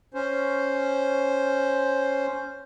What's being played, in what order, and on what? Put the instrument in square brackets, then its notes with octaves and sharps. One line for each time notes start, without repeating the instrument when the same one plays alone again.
[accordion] C#4 C5